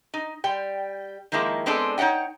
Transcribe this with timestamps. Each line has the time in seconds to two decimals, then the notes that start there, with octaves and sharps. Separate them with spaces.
0.14 D#4
0.44 G3 G5
1.32 D#3 F3 G#3 A#3 E4
1.66 G#3 B3 C4 D4 G#4 A4
1.98 D#4 C#5 D#5 F#5 G5